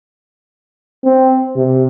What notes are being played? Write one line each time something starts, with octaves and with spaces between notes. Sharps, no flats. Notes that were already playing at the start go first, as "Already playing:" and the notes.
C4
C3